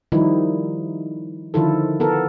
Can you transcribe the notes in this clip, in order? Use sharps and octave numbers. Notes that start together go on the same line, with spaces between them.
D#3 F3 G3 D#4 E4
D3 D#3 F3 E4 F4 A4
B3 F4 A4 A#4